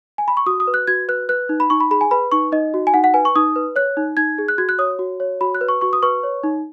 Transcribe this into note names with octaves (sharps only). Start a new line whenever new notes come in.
G#5
B5
C#6
F#4 D#6
D#6
B4
F#6
F#4 G#6
B4 F#6
B4 F#6
D#4
B5
D#4 C#6
B5
G#4 B5
G#5
B4 B5
D#4 C#6
D#4 D#5
F#4
G#5
D#4 F#5
F#5
B4 G#5
C#6
D#4 D#6
B4
C#5 F#6
D#4
D#4 G#6
G#4
F#6
F#4 G#6
F#6
C#5 D#6
F#4
C#5
F#4 B5
F#6
B4
C#6
F#4 C#6
D#6
B4 C#6
C#5
D#4